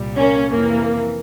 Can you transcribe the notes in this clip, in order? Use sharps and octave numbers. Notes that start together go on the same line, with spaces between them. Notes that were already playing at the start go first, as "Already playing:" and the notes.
Already playing: C2 A#2 G3
A#3 C#4
F2 C3 E3 A#3